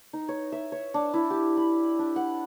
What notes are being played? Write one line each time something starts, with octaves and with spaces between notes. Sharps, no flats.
D#4
C#5
E5
C#5
D4
E4
G4
B5
D4
F#5